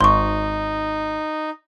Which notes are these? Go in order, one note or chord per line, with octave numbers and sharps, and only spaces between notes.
G#1 D#4 C6 C#6